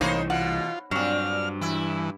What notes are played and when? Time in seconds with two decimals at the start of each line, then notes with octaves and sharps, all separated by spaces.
0.01 C2 A2 E3 A#3 D#4 C5 C#5
0.30 B2 F4 F#5
0.91 G2 A#2 F#3 C4 D4 F6
1.61 E3 E4